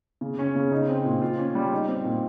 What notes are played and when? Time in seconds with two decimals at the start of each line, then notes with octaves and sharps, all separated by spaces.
0.21 C#3
0.39 C#4
0.55 C#3
0.72 D#4
0.88 C4
1.05 A#2
1.22 F4
1.38 C#4
1.55 G3
1.72 D#4
1.88 C4
2.05 A#2